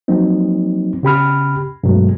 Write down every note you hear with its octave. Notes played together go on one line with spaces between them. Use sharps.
F3 F#3 A#3 C4 D#4
C#3 G4 B5 F6
G2 B2 F#3 G#3 A3